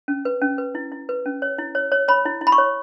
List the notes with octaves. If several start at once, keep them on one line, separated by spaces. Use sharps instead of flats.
C#4
B4
C#4
B4
E4
E4
B4
C#4
C#5
E4
C#5
C#5
C#5 B5
E4
E4
B5
C#6
C#5